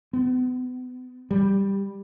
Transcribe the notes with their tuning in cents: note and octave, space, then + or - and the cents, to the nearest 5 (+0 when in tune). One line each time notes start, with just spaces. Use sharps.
B3 +35
G3 +5